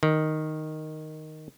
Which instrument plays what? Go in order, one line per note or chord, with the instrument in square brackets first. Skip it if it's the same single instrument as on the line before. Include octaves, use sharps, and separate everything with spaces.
[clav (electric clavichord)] D#3